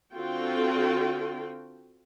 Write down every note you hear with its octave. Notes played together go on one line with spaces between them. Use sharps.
D3 C4 F4 F#4 A4 G5